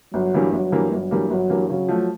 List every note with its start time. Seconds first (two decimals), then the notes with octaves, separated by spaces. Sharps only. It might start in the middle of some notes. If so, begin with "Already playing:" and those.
0.14 G1 F#3
0.34 G2 E3 G3 A#3
0.53 G1 F#3
0.72 G2 E3 G3 A#3
0.91 G1 F#3
1.11 G2 E3 G3 A#3
1.30 G1 F#3
1.50 G2 E3 G3 A#3
1.70 C#3 F#3
1.89 F3 A3